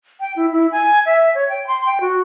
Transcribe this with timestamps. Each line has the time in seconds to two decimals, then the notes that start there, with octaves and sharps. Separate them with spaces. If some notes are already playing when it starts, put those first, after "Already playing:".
0.20 G5
0.36 E4
0.51 E4
0.72 G#5
1.06 E5
1.35 C#5
1.49 G5
1.67 C6
1.86 G5
2.01 F#4